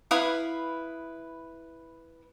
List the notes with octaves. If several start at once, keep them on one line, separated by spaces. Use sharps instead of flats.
E4 B4 F5 D#6